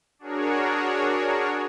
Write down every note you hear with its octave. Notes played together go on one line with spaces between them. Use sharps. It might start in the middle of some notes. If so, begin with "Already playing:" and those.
D4 F#4 G#4 A#4 C#5